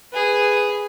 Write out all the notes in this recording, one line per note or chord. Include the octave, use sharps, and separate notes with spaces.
G#4 B4